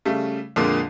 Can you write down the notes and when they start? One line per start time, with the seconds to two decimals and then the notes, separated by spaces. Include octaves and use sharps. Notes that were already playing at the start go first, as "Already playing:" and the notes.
0.05 C#3 G3 A3
0.56 F2 A#2 D3 G#3 A#3 F4